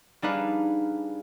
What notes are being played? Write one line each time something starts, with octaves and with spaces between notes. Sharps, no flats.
G3 D4 D#4 G#4 B4 F5